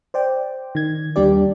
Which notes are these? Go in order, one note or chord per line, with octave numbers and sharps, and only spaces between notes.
C5 D5 G5
D#3 G#6
D#2 G3 D4 G4 D5